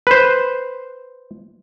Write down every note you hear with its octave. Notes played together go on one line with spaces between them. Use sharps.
B4 C5